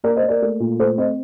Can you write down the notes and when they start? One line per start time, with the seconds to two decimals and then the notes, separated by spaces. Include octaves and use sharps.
0.04 A#3 A#4 D5
0.16 C5 D#5
0.23 A#3
0.29 A#4 D5
0.42 A3
0.60 A#2
0.79 A3 A4 C5
0.98 C4 C5 D#5